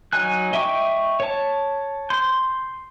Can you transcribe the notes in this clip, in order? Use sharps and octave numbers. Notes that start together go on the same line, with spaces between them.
F#3 D#4 G#5 F#6
D#5 E5 G5 C#6 D6
C#5 A5
C6 G6